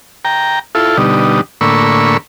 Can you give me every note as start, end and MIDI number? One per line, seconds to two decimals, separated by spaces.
0.25 0.59 79
0.25 0.59 82
0.75 0.97 64
0.75 0.97 65
0.75 0.97 69
0.97 1.41 47
0.97 1.41 50
0.97 1.41 55
0.97 1.41 63
1.61 2.17 45
1.61 2.17 50
1.61 2.17 58
1.61 2.17 83
1.61 2.17 85
1.61 2.17 88